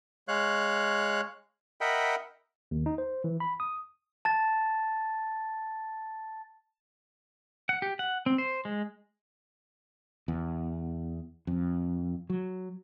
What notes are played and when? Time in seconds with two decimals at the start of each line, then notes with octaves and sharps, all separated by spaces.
0.28 G#3 C#5 F5 F#6
1.81 A#4 D#5 E5 F#5 G5 B5
2.71 D#2
2.86 D#4
2.98 C5
3.24 E3
3.40 B5
3.60 D#6
4.25 A5 A6
7.69 F#5
7.82 G4
7.99 F#5
8.26 C4
8.38 C5
8.65 G#3
10.28 E2
11.47 F2
12.30 F#3